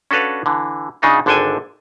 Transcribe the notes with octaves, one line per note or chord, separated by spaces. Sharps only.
C#4 D4 F#4 A4 B4 F5
D3 E3
C#3 D4 D#4 F4 F#4
G#1 D3 D4 A4 G5 G#5